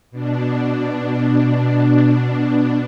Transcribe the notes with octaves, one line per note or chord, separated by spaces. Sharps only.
B2 D4